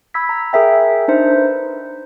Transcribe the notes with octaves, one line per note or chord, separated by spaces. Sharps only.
B5 E6 G#6 B6
A#5
G#4 A#4 E5 G5
D4 D#4 C5 E5
D#4 B4